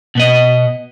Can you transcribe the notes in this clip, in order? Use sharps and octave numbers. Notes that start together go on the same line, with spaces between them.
B2 B3 D#5